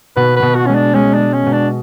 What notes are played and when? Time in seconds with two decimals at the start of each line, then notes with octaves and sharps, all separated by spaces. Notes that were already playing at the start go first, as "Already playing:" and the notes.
0.16 B2 B4
0.36 B4
0.42 B2
0.55 F#4
0.66 G#3 C#4
0.75 D4
0.95 G#3 C#4
1.14 D4
1.20 G#3
1.34 C#4
1.46 B2
1.53 D4